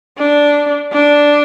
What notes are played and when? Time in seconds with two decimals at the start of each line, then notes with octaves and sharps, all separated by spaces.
0.18 D4
0.93 D4